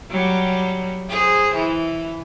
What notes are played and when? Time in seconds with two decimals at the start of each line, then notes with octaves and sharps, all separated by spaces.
0.10 F#3 G3
1.09 G#4 C5
1.54 E3